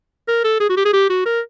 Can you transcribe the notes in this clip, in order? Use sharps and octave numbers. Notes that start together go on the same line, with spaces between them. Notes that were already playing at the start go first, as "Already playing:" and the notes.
A#4
A4
G#4
F#4
G4
G#4
G4
F#4
A#4